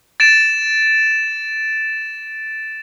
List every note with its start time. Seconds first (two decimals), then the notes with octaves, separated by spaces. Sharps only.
0.20 A6 D7 E7